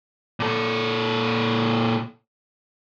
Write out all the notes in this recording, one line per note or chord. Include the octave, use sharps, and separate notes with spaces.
A#2 A4